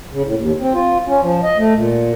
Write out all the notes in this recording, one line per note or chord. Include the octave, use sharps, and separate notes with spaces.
C#3
A2
D#2
C4
F4
C#4
F3
D#5
A3
A#2